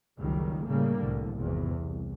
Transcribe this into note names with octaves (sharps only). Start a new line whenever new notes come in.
F#1 C#2 D#3 F#3 G3
A2 C#3 G3 A#3
C2 A2 D3
G#1 E2 C3
C2